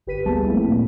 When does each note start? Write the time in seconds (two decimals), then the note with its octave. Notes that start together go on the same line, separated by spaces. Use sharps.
0.07 G1 G4 B4 B6 D#7
0.26 D2 G3 A#3 B3 G#4 A5
0.46 F3 A3 A#3 C4 E4
0.66 A#2